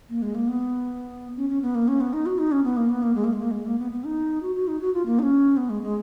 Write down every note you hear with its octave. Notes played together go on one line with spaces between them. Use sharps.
A#3
G#3
A#3
B3
C#4
C#4
B3
A#3
C#4
B3
D#4
F#4
D#4
C#4
B3
A#3
B3
A#3
G#3
A#3
G#3
A#3
G#3
A#3
B3
B3
D#4
F#4
F#4
D#4
F#4
F4
A#3
D#4
C#4
B3
G#3
G#3